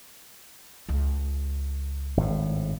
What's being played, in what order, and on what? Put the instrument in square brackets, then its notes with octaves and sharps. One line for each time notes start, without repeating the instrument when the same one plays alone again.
[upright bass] C#2
[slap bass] G#1 A2